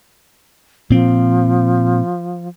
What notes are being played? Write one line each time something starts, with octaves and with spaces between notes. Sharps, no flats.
A#2 F3 C4